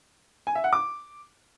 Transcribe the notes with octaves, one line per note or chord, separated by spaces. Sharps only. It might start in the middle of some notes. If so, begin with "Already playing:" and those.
G#5
E5
F#5
D6